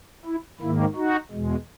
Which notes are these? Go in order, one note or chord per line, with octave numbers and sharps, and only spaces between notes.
E4
G#2 D#3 A#3 E4
D#4 F#4
E2 B2 G#3